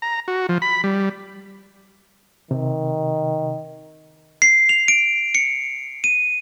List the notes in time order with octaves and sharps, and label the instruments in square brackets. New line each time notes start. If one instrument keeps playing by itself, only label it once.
[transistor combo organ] A#5
F#4
F3
B5
G3
[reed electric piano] C3 [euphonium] D#3
[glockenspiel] C7
F7
D7
C#7
D#7